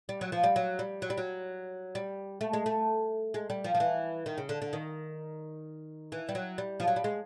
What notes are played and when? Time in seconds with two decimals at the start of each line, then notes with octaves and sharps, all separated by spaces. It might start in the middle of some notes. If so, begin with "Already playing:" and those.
0.09 G3
0.21 F#3
0.32 F3
0.43 G3
0.56 F#3
0.79 G3
1.02 F#3
1.10 G3
1.18 F#3
1.95 G3
2.41 A3
2.53 G#3
2.66 A3
3.34 G#3
3.50 G3
3.64 F3
3.75 F3
3.80 E3
4.26 D#3
4.38 C#3
4.49 D3
4.62 D3
4.73 D#3
6.12 E3
6.29 G3
6.35 F#3
6.58 G3
6.80 F3
6.88 F#3
6.96 G3
7.04 G#3